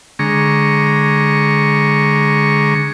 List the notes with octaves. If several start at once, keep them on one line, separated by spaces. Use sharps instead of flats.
D3 G#3 A#5 C#6